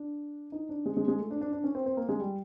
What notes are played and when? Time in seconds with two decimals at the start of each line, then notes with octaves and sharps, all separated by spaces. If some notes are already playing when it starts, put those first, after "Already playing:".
Already playing: D4
0.52 D#4
0.69 D4
0.86 G#3
0.97 G#3
1.08 G#3
1.20 A3
1.31 D4
1.41 D4
1.53 D4
1.64 C#4
1.75 C4
1.86 C4
1.97 A#3
2.09 G#3
2.20 G3